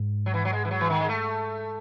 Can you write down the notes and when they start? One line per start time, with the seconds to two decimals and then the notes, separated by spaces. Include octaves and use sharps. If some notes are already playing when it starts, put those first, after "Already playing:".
Already playing: G#2
0.26 F#3
0.34 E3
0.45 F#3
0.53 G#3
0.65 E3
0.71 F#3
0.81 E3
0.90 D#3
1.01 G#3
1.09 A3